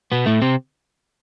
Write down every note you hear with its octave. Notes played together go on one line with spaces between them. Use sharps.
B2 B3
A2 A3
C3 C4